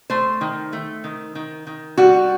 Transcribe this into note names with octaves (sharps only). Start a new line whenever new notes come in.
A3 C5
D#3
A3
D#3
D#3
D#3
G3 F#4